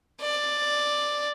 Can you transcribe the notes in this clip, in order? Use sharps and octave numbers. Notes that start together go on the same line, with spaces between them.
D5